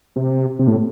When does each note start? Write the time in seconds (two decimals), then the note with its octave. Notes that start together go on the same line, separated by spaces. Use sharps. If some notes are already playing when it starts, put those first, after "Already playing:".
0.16 C3
0.59 C3
0.67 A2